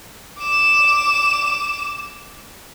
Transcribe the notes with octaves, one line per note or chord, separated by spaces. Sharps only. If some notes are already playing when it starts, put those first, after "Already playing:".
D6 E7